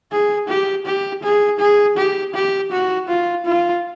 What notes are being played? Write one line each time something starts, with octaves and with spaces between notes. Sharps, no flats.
G#4
G4
G4
G#4
G#4
G4
G4
F#4
F4
F4